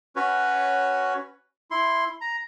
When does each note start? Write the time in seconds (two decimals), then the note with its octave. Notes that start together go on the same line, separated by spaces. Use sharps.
0.16 C#4 F#4 B4 C#5
1.71 E4 C6
2.21 A#5